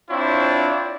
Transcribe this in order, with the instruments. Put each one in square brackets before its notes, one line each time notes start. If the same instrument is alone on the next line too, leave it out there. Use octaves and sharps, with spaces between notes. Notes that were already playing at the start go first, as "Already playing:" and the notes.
[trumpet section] C4 D4 E4 F4 C#5